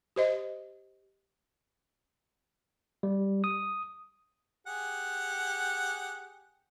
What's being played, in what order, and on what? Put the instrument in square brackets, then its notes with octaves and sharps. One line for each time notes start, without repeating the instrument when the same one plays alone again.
[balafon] G4 C5 D#5
[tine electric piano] G3
D#6
[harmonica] G4 G#4 F#5